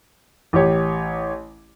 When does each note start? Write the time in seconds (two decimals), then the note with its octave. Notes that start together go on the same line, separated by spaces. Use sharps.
0.53 A1 G4 C#5